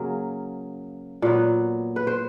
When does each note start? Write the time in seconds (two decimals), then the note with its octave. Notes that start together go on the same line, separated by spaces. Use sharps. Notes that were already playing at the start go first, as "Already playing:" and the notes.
Already playing: C#3 F#3 A#3
1.22 A#2 F#3 B3
1.96 B4
2.07 C5